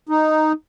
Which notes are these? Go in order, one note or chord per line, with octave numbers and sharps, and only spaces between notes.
D#4